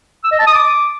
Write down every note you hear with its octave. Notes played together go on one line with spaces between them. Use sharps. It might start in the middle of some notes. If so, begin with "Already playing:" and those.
E6
D#5
A5
D#6
D6